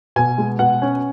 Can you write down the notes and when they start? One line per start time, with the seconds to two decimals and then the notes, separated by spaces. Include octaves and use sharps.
0.16 B2 G#5
0.38 G#3
0.59 B2 F#5
0.82 C#4